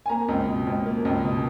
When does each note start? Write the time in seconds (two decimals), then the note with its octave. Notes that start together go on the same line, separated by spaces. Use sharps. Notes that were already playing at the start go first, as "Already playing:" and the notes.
0.06 G#5
0.09 A#3 A#5
0.29 C#2
0.48 B2
0.67 C#2
0.86 A#3
1.05 C#2
1.25 B2